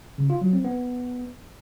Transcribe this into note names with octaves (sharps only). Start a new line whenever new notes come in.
C#3
F4
F#3
C4
B3